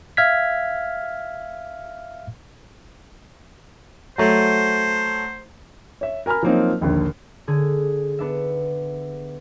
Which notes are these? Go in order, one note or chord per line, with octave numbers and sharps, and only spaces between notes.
E5 F5 F6 G#6 B6
F#3 A3 C5
C#5 E5
A#4 G#5 A#5 B5 F6
F3 F#3 A#3 C4 D#4
A#1 D#2 D3
D3 G#4
B3 D4 E5